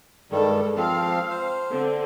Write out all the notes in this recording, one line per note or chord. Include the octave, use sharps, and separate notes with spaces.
G2 D#3 G3 G#3 A4
F3 C4 F5
C5
D3 C4